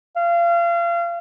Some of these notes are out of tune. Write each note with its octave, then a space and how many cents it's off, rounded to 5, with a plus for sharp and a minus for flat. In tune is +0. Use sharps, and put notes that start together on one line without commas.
F5 -30